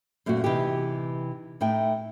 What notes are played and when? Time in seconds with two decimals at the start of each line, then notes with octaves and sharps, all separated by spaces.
0.26 F#2 A#2 A3 C4 F#4
0.44 C3 E3 D#4 G4
1.61 A2 D#4 E5 G5